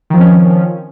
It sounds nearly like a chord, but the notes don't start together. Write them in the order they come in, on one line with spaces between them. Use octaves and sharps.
D#3 F3 C4 C#4